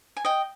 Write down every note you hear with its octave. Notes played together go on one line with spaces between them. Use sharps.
G#5
D#5 G5